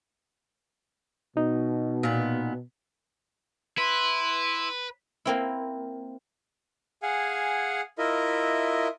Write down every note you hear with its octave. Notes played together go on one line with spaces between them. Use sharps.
B2 D#4
A#2 B3
E4 B4 C6
A#3 C4 E4
G#4 F5 F#5 G#5
E4 F4 A#4 D#5 E5